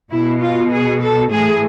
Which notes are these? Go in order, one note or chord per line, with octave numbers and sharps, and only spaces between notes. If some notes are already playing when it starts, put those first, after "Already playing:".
B2 E4
F4
G#4
A4
A2 E3 G#4